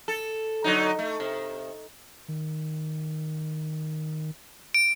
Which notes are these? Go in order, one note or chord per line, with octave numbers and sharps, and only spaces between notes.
A4
D3 F#3 D#4
A3
C3
D#3
D7